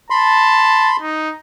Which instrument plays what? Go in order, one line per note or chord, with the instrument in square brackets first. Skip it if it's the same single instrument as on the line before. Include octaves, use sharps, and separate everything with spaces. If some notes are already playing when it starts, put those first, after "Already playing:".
[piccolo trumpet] A5 [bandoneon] B5 C6
[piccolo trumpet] D#4